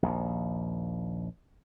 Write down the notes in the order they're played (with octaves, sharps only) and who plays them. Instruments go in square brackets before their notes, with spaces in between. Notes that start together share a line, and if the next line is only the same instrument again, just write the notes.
[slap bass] A#1 D#2